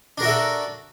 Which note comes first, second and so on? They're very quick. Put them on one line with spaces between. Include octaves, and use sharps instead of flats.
D4 A#4 F#4 E5 A4